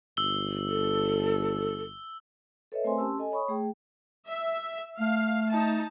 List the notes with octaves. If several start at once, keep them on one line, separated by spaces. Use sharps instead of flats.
G1 E6 G7
A4
A4 B4 C#5 D#5 E5
A3 C4 A#4 C5 G#5 C6
C#4 G4 A5 C6 E6
A4 D#5 G#5
C#5 B5 C#6 D#6
A3 G#4 G5
E5
A3 F5
D#4 A5